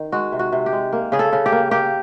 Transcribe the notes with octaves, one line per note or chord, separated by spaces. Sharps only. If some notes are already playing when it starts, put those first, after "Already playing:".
Already playing: D#3
G#3 F#4
C3
F#4
C3
G4
G#3
A#3
C#3 G#4
A4
C#3
G4
A#3
A#3 G4